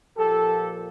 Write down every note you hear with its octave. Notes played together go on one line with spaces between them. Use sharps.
A#2 F3 A#3 G4 A4